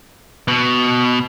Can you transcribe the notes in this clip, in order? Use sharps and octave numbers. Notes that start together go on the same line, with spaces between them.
B2